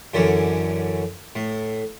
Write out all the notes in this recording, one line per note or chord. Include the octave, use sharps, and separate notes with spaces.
F#2 D3 E3 C#4
A2